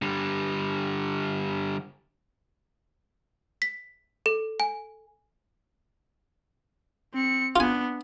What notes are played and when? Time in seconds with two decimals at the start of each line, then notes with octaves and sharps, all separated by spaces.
0.02 D3 G3
3.62 B6
4.26 A4
4.60 G#5
7.14 C4 C#7
7.56 B3 D4 F4 G#5